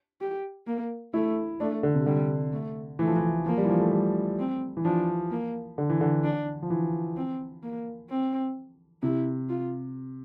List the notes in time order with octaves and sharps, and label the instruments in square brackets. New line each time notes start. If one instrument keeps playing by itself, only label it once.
[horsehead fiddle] G4
A#3
[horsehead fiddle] A3 [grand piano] E4
[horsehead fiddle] A3 [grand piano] D4
[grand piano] D3
C3
[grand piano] D3 [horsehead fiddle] G3
[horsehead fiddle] A3
[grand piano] E3 [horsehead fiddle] A3
[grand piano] F3
E3
[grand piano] F3 [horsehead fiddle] A#3
[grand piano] G3
E3
F3
A3
G3
[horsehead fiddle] C4
[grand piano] E3
[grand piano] F3 [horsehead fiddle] D4
[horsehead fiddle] A#3
[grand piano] D3
E3
D3
[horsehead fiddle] D4
[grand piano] F3
E3
[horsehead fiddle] C4
A#3
C4
[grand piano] C3 [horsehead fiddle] E4
[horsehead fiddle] F4